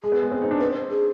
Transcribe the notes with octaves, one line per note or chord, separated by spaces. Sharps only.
G#3 G#4
B3
G#3
C4
D#4
D4
C4 B4
C5
G#4